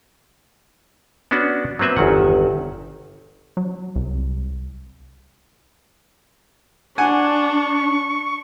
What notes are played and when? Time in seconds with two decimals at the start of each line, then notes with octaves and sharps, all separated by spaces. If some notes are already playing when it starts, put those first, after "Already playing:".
1.31 B3 C#4 D4 F#4
1.79 F#3 A#3 C4 B4 E5
1.97 G1 E2 D#3 F#5
3.57 F#3
3.96 C2
6.98 D4 F#5 G#5 C#6